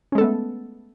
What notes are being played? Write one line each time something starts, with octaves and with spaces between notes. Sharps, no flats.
G#3 A3 B3 C#4 A4